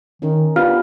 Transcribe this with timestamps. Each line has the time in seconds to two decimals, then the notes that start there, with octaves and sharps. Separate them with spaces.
0.22 D#3 C#4 D#4 A#4
0.56 B3 D4 F4 G4 B4 F5 F6